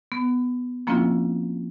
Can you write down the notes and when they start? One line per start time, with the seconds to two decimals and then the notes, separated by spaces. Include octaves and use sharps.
0.12 B3
0.87 F3 A#3 C4 C#4 E4 F4